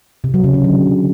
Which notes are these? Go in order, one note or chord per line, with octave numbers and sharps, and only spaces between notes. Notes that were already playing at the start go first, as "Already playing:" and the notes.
C3
F#3
C#3
C#3
D3